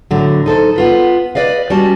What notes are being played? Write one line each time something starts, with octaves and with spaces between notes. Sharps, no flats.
A2 D3 F#3
D#4 A4 C5
B3 F4 B4
B4 D5 D#5 F5
G3 C#4 F#4 A5